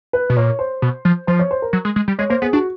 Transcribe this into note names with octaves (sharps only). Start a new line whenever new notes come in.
B4
B2
A#2 C#5
C5
B2
F3
F3 C5
C#5
C5
A#4
F#3
G#3
G#3
G3
G#3 C#5
A#3 C5
B3 G#4
D4 F#4